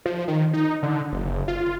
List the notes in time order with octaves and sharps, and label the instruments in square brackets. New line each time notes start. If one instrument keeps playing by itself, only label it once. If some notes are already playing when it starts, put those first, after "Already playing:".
[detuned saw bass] F3
D#3
D#4
D3
F#1
F4